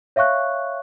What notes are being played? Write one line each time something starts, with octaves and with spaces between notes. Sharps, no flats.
C#5 E5 F5 C#6 F#6